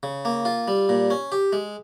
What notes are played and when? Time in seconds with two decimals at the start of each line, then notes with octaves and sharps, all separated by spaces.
0.03 C#3
0.25 A#3
0.45 F4
0.68 G3
0.89 A#2
1.10 C#4
1.32 G4
1.53 G#3